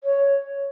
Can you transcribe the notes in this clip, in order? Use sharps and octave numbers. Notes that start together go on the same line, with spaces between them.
C#5